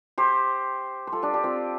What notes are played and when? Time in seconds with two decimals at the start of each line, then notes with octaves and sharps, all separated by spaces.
0.18 G4 C5
1.07 C5
1.12 F4 A4
1.22 D4 G4
1.34 D4 G4
1.43 C4 F4